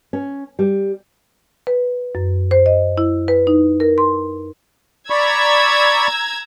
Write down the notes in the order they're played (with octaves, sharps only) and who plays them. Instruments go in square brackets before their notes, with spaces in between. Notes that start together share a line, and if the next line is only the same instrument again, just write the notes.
[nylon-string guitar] C#4
G3
[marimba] B4
F#2
C5
D#5
E4
B4
D#4
A#4
C6
[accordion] D5 B5 C#6 [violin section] A#5 E6 G#6